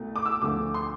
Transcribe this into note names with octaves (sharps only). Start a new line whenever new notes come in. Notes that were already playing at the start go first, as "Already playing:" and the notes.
Already playing: C2 B2 A3
D6
E6
D2 D3 F3 A3 D6
C6